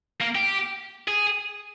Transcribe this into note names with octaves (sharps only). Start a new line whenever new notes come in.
A#3
G4
G#4